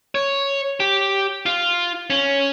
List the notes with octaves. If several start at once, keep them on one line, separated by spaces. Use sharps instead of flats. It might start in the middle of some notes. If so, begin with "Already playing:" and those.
C#5
G4
F4
C#4